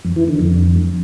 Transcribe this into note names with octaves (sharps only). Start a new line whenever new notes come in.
F2
E3
D3
F2